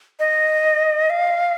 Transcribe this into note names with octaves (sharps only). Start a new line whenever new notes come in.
D#5
F5